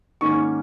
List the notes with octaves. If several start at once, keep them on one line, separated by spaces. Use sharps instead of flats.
G#2 D#3 A#3 C#4 C#6